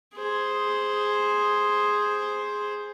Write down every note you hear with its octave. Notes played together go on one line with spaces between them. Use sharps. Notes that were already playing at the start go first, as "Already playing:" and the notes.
G#4 C5